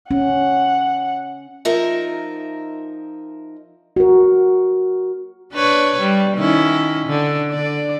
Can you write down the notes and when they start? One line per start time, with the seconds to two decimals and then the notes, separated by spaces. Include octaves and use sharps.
0.11 C#4 F#5
1.65 F3 D#4 A#4 E5
3.96 F#4 A#4
5.53 D4 B4 C#5
5.99 G3
6.38 D#3 C#4 E4
7.07 D3
7.50 D3 D5